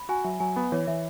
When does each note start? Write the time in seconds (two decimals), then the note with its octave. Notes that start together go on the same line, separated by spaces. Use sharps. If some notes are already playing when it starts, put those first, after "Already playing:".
Already playing: B5
0.09 F#4 G#5
0.24 F#3 E5
0.40 F#3 G#5
0.56 B3 B5
0.72 E3 C#5
0.87 E3 E5